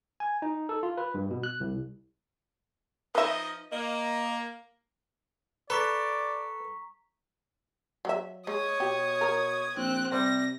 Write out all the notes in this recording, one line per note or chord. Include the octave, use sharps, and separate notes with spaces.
G#5
D#4
A4
F4
B4
G2
B2
F#6
C2
F3 D#4 B4 D#5 E5
A#3 D#5
A4 B4 D5 A#5 C#6 B6
F#3 E5
G#3 C#5 D#6 G#6
B2 G4
A#4
A#1 C4 F#6
C3 G3 C5 A#6